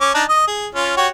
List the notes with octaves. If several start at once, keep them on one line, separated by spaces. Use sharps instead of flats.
C#4 D6
D4 D#4 A5
D#5 D#6
G#4
C#4 F4
F#4 G4 C#5